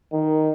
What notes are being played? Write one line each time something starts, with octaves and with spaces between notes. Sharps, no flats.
D#3